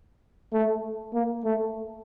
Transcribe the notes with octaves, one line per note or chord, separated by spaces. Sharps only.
A3
A#3
A3